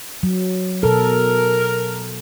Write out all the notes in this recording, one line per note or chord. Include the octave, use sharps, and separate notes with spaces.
F#3
B2 A4 A#4